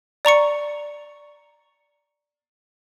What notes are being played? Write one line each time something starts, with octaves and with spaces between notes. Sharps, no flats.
D5 A#5 C#6 C#7